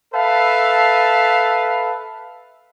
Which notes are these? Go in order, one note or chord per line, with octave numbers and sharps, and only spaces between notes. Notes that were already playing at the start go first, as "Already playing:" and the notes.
A4 B4 E5 F5 A5